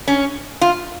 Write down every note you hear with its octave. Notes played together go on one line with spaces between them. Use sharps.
C#4
F4